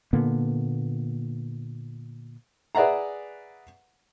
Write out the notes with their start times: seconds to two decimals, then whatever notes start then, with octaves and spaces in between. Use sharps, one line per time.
0.13 A#2 D3 A#3 B3
2.75 G#4 B4 D5 E5 F#5 A#5